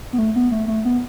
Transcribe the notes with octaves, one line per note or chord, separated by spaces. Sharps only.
B3
A3
B3
A3
A3
B3